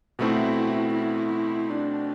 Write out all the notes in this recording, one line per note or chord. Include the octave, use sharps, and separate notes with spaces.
B2 A3 C4 E4 F#4
E4
D4